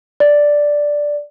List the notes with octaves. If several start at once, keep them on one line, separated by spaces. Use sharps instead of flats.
D5